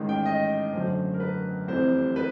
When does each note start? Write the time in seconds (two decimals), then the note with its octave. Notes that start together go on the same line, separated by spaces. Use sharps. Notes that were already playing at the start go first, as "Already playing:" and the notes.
Already playing: A1 G#2 D#3
0.09 G5
0.26 D#5
0.73 F#2 D3 F#3 A3 C5
1.14 A#4
1.20 B4
1.68 F1 F2 C3 E3 C5
2.16 B4